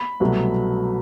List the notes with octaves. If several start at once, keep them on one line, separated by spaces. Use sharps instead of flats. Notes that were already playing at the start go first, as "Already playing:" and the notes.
Already playing: B5
C2 B2 F#3 A3